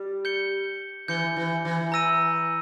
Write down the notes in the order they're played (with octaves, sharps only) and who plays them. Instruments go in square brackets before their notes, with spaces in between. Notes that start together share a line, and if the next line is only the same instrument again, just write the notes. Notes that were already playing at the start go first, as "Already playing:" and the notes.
Already playing: [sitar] G3
[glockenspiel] G6 C#7 G7
[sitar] E3 [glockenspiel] G6 C#7 G7
[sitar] E3
E3
[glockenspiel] A#5 E6 A#6 D#7